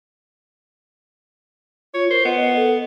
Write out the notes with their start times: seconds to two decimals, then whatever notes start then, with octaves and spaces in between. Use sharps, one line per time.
1.94 F4 C#5
2.10 A#4 C5
2.25 B3 D#5
2.41 D#5
2.56 A4